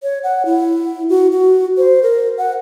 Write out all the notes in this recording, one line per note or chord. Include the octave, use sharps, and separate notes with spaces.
C#5
F#5
E4
F#4
F#4
C5
A#4
F#5